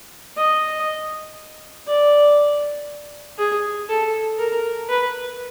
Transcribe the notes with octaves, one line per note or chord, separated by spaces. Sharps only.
D#5
D5
G#4
A4
A#4
B4